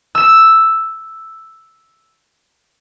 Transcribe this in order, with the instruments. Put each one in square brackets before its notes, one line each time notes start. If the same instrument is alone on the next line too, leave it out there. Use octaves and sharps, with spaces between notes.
[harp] E6 E7